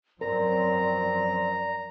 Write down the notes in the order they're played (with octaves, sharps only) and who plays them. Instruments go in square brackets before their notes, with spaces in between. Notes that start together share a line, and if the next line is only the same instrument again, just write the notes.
[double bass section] F#2 F3 C4 [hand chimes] A#4 [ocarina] D5 [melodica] A#5